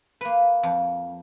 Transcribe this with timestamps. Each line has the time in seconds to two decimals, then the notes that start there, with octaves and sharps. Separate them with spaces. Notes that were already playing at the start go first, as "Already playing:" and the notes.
0.21 A#3 B4
0.63 F2